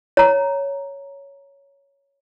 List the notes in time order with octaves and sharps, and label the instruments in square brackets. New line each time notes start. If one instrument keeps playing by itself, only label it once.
[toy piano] C#5 A#5